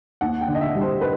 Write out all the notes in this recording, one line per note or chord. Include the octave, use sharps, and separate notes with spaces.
D#2 F#5
G5
D3
D#5
E5
G3
C5
B4